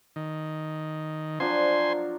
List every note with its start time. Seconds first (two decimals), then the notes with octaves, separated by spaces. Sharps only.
0.16 D#3
1.40 F3 F#3 D4 C5 G#5 C6